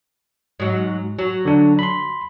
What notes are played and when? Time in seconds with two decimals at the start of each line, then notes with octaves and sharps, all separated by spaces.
0.60 G#2 F#3
1.19 F#3
1.45 D3 D4
1.79 B5 C6